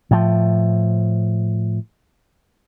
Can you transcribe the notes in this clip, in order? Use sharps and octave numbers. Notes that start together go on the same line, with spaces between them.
A2 F3